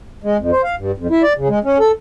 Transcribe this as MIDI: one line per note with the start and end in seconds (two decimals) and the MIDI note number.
0.24 0.37 56
0.38 0.51 41
0.52 0.62 72
0.64 0.75 77
0.78 0.92 43
0.98 1.07 41
1.10 1.22 64
1.23 1.33 74
1.37 1.48 49
1.49 1.59 56
1.64 1.78 61
1.80 1.92 69